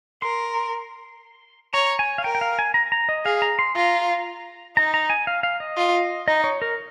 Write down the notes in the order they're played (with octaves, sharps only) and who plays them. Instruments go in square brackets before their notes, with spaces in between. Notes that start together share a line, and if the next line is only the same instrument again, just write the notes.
[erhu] A#4 [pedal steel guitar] C6
[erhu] C#5 [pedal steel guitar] A#5
[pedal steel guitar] G#5
F5
[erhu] A#4 [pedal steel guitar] G5
[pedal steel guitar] G5
F5
G#5
A#5
A#5
D#5
[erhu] G#4 [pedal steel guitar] F5
[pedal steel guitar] A#5
C6
[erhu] F4 [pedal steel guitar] A#5
[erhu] D#4 [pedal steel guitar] A#5
[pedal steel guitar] A#5
G#5
F5
F5
D#5
[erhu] F4
[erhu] D#4 [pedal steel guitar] D#5
[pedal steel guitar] C#5
A#4